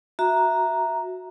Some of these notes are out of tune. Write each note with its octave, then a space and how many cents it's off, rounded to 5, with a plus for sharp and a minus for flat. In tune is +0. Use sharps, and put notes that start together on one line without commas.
F#4 -10 E5 +0 A#5 +0